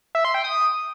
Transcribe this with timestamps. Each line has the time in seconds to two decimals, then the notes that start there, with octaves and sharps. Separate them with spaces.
0.15 E5
0.25 C6
0.34 G5
0.44 D#6